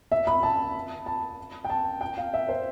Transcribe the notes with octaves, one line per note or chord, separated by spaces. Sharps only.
E5
B5
A5
A5
G5
A5
G5
F5
E5
C5